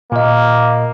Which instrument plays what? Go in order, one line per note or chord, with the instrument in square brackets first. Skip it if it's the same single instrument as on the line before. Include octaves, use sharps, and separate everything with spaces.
[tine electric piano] A#2 D#5 [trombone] A#3